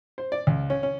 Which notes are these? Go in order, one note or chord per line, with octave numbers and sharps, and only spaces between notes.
C5
D5
C#2
C#4
C#4